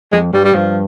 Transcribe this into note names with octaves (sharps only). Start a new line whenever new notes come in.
F2 G#3
G2 G3
G3
G2 F3